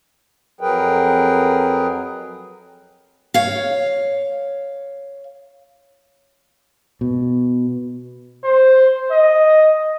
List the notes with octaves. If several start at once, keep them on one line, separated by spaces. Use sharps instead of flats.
F2 F#3 G#4 A#4 B4 G5
C#5 F5
B2
C5
D#5